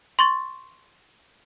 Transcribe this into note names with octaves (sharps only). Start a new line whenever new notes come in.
C6 C#6 A6